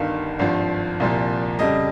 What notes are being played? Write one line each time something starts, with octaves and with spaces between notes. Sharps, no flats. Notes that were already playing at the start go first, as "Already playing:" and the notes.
Already playing: G1 G2 D#3 F5
G#1 G2 F3
C2 A#2 F3
F2 C#3 G3 D#5